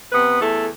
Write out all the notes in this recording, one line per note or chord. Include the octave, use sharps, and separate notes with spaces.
C3 B3 B4
E2 A3 A4